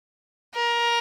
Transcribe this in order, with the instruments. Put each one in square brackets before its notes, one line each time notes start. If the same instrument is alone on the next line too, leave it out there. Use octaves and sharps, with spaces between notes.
[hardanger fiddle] A#4